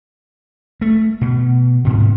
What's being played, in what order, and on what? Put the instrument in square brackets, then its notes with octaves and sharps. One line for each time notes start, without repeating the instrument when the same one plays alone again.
[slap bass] A3
B2
D2 G#2 C3